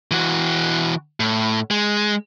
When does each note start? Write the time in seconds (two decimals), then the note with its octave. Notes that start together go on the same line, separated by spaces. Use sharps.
0.11 E3 F#4
1.20 A2
1.71 G#3